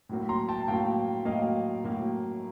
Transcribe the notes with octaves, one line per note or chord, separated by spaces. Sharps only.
A2 F#3 A#3
A#5 C6
G5 A5
A2 F#3 A#3 F5 G5
A2 F#3 A#3 D#5 F5
A2 F#3 A#3